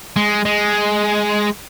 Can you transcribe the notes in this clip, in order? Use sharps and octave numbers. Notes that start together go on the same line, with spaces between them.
G#3
G#3